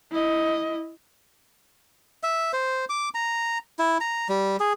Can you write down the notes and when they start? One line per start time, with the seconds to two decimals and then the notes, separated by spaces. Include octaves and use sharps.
0.12 E4 D#5
2.23 E5
2.53 C5
2.89 D6
3.14 A#5
3.79 E4
4.00 A#5
4.29 G3
4.60 G#4